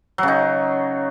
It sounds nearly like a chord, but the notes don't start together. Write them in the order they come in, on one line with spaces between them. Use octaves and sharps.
F#3 C#3 D#4